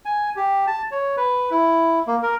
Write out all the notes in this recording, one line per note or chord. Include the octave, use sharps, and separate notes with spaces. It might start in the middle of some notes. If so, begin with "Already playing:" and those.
G#5
G4
A5
C#5
B4
E4
A#3
A#4